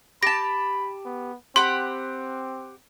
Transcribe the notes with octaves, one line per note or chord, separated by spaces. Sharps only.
G4 A5 B5 A#6
B3
C4 G4 F#5 B5 C6